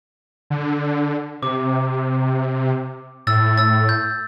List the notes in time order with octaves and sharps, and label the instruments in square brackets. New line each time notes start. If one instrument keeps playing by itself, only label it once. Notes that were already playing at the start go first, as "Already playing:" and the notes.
[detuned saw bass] D3
[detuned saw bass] C3 [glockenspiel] D6
[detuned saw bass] A2 [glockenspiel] E6 A6
[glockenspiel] E6 A6
G6